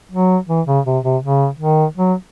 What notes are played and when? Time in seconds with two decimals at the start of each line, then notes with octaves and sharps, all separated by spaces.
0.12 F#3
0.48 E3
0.67 C#3
0.86 C3
1.04 C3
1.22 C#3
1.59 D#3
1.96 F#3